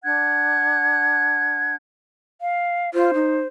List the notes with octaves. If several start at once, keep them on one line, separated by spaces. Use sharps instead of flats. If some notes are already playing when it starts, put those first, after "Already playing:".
D4 F#5 F#6 G#6
F5
F4 C5
D#4